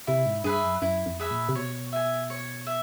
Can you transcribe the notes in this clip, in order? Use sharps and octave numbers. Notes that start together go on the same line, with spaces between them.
C3 E4
G#2
G2 G#4 B4 E5
F#2
F#2 E4
F2
G#4 B4 E5
A#2
C3
B2 C#5
E5 G#5
C#5
E5